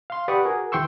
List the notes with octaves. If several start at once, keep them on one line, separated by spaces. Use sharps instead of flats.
F5 C6
G4 B4 D5 F#5 C#6 D#6
F#4 G#4 A#4
D#2 E3 G5 C6 C#6 E6